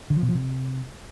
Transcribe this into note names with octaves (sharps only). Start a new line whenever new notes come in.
D3
F3
B2
F3
C3